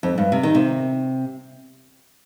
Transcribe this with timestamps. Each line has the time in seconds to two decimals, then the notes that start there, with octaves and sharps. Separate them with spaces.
0.03 F2
0.18 G2
0.32 C3
0.43 D#3
0.55 C3